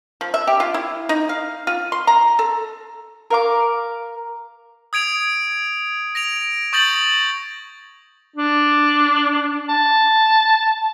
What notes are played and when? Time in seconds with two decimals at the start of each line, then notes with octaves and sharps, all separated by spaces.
0.21 F3
0.34 E5
0.47 G4
0.60 F4
0.74 E4
1.09 D#4
1.29 F5
1.67 F4
1.92 C6
2.07 A#5
2.39 A4
3.31 A#4 F5 D6
4.93 D#6 G#6 D7 F7
6.15 A#6 D7 F7
6.73 C#6 D#6 G6 A6 A#6 F#7
8.36 D4
9.69 A5